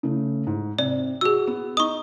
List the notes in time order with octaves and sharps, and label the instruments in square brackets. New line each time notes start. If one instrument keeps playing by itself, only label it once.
[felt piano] C#3 A3
G#2
[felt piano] C3 [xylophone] D5
[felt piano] F#4 [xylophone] G#4 E6
[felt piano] B3
[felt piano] D#4 D#5 [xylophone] C#6 D#6